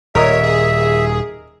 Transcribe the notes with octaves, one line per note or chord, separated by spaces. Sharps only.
D#1 A#4 C#5 D#5 E5
G#4